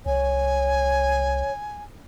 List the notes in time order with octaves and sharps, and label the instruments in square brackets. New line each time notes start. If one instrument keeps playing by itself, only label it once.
[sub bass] C2 [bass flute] C#5 [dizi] G#5